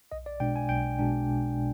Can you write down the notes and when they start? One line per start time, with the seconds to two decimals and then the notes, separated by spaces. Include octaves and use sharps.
0.12 B1 D#5
0.26 D5
0.40 B2 G#3 D4 G5
0.56 G#5
0.69 B1 G5
0.99 B2 G#3 D4